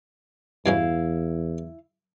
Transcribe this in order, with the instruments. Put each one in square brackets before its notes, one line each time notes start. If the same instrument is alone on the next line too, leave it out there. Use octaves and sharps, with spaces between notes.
[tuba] E2 [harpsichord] G2 B2 C#4 [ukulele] E4 F5